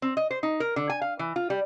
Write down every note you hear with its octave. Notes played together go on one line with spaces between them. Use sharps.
C4
D#5
C5
D#4
A#4
D3
G#5
F5
E3
F4
G3